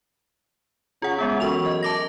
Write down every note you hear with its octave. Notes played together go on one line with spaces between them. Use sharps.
C#3 F4 F#5
G#3 B3 C#4
F#2 E3 C#6 F7
D#5
A5 D6 A#6